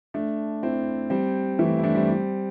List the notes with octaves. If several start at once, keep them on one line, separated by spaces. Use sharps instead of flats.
A3 D4
C4 E4
G3 C4
E3 A3
E4
A3 D4
G3 C4